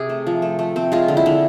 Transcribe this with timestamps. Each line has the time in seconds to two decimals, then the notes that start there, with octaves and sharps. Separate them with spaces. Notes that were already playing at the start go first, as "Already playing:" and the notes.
Already playing: C3 C4 G#4
0.09 A3
0.27 F3
0.42 A3
0.59 A3
0.76 C4
0.92 G#3 F4
1.08 D3
1.17 E4
1.26 D3